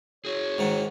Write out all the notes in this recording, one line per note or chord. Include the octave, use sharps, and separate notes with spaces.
F#4 G#4 C#5
G#2 D#3 F#5